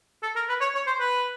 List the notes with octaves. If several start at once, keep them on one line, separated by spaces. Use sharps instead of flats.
A4
A#4
B4
C#5
C#5
C5
B4